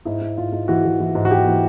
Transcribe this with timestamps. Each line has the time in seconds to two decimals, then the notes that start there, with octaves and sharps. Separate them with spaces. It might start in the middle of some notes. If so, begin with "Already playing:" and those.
0.05 G#2 E4
0.21 G#2
0.38 G#2 F4
0.52 G#2
0.68 E3 F#4
0.85 E3
1.00 E3
1.15 G#2
1.25 F#4
1.31 G#2 G4
1.47 E3